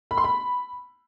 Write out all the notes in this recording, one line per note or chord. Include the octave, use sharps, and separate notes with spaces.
B5
C6
B5